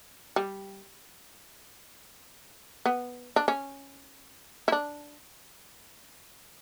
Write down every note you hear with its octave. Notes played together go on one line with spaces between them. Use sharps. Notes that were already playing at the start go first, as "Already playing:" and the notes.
G3
B3
D4
C#4
E4
D4